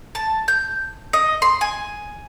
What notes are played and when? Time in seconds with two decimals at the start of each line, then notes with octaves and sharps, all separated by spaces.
0.15 A5
0.48 G6
1.13 D#5
1.42 C6
1.61 G#5